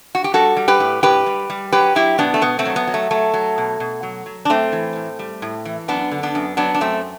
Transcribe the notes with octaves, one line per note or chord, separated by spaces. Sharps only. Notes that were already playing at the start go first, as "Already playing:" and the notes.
F#4
G4
G3 F#4 A4
G3
G4 B4
A2
A2 G4 B4
G3
G3
F#3 G4 B4
F#3 E4 G4
B2 B3 D4
A3
B2 B3
A3 C4
F#3
B3
F#3
A3
F#3 A3
F#3
B2
B2
F#3
F#3
D4
A2 A3 C4
E3
A2
G3
A2
E3
F#2 B3 D4
D3
B3 D4
F#2
F#3 B3 D4
D4
F#2 A3 C4